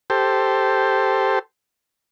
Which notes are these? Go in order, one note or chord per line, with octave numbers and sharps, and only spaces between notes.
G4 A4 C5